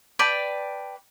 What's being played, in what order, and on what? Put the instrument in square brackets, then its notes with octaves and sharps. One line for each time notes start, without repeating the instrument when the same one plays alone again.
[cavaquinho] B4 D5 G5 A5